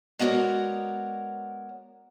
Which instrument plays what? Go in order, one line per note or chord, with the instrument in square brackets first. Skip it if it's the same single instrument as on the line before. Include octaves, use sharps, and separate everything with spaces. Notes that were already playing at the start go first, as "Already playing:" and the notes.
[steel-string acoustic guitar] G#3 B3 F#4 A#4 C#5 D5